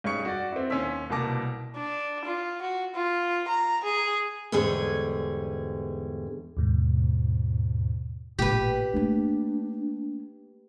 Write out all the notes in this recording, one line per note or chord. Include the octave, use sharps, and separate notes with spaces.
G2 C#4 D#4 G#4 C#6 C#7
F#4 D5
C4 E4
D#2 C#4 G#5 C6 E6 B6
C2 B2 A#3 A5 D6 A#6
D4
F4
F#4
F4
A#5
G#4
E2 G#2 D3 G3 G#4 C#5
D#2 G#2 B2
A1 A#2 G4 B4
A3 A#3 D4